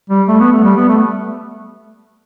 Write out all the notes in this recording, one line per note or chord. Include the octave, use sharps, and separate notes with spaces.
G3
A3
B3
A3
G3
B3
A3